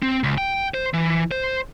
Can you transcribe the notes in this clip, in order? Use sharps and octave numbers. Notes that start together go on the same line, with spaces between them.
C4
C#2
G5
C5
E3
C5